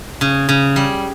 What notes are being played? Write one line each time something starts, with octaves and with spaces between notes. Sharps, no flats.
C#3
C#3
G3